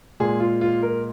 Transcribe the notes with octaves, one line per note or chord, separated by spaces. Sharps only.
A#2 G#3 G#4
F4
F4
A#4